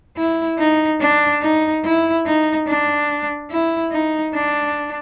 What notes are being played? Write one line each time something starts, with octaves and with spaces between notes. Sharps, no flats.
E4
D#4
D4
D#4
E4
D#4
D4
E4
D#4
D4